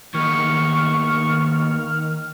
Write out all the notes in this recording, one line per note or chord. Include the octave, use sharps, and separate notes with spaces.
D#2 D#3 B3 C#6 F6